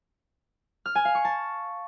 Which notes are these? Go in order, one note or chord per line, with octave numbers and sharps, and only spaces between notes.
F6
G#5
F5
C#6
A5